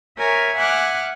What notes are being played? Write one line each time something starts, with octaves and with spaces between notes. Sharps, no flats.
A#4 C#5 E5 G#5
E5 F#5 G#5 D6 F6 F#6